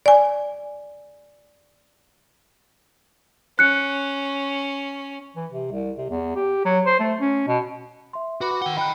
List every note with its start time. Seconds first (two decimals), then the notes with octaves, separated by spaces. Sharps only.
0.06 D5 G#5
3.59 C#4 F#6 C#7
5.36 E3
5.51 C3
5.72 C2
5.98 C3
6.11 E2
6.36 G4
6.65 F#3
6.86 C5
7.00 A3
7.21 C#4
7.48 B2
8.13 E5 C6
8.41 F#4 B4 B5 D6
8.62 D#3 F#5 G5 G7
8.77 D#5 G5 B5 F#6